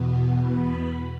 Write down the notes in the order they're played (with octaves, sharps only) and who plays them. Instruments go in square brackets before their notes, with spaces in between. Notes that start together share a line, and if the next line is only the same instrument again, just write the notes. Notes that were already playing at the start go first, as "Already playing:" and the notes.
Already playing: [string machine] E2 B2 B3
B5